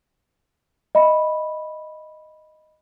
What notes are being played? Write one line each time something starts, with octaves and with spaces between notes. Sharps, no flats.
D#5 E5 B5